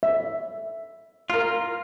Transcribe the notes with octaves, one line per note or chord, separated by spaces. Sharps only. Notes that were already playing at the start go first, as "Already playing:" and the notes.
E5
F4 A#4 F6